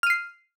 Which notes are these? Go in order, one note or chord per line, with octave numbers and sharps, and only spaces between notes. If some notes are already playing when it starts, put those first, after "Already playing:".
F6 C7 D#7